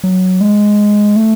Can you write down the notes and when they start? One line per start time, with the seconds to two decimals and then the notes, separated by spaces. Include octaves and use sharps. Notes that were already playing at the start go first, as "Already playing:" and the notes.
0.04 F#3
0.41 G#3
1.16 A3